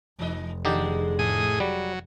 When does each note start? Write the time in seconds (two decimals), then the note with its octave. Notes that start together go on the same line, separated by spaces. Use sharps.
0.19 F1 E3 D#4 D#5
0.65 D3 D#3 G#3 D#4 G4
1.19 A2 G#4 D#6
1.60 F#3 G3